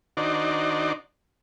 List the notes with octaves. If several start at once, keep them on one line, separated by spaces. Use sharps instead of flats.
D#3 D4 D#4 F#4 C5 D5